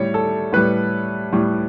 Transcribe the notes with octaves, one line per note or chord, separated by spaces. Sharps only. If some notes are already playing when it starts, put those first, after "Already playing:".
Already playing: A2 G3 C#5
A4
A2 G3 B4
A2 G3